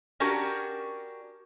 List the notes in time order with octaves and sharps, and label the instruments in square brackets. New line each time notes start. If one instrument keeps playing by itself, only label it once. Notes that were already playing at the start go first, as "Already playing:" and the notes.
[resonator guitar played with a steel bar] C#4 D4 F#4 G4 A#4